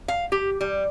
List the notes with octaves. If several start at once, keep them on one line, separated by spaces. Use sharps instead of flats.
F5
G4
G3